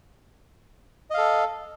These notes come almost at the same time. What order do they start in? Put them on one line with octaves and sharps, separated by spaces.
D#5 F5 A4